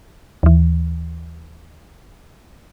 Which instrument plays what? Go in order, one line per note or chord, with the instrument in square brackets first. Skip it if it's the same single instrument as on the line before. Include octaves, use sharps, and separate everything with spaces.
[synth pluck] D#2 E3